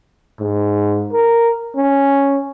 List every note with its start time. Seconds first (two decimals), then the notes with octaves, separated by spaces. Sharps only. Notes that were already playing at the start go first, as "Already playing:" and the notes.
0.40 G#2
1.13 A#4
1.76 C#4